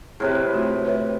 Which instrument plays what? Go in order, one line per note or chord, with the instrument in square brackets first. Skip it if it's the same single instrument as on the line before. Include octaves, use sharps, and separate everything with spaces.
[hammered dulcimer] A2 C3 B4 [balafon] G#4
[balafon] A3 F4 F#4
B4 C#5 E5